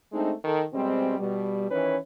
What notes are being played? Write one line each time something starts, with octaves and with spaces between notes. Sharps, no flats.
G#3 A3 C4 D4 D#4
D#3 A4
B2 G3 G#3 C4
B2 G3
D#3 E3 C#4 B4 C#5